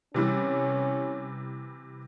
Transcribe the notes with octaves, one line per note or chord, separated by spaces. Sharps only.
C3 E3 G3 C#4